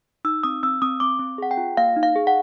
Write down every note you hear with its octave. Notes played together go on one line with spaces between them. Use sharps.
D#4 E6
C4 D#6
C4 E6
C4 D#6
C4 D6
C4
G#4 F#5
G5
F4
A#3 F5
D#4
F5
G#4
F#5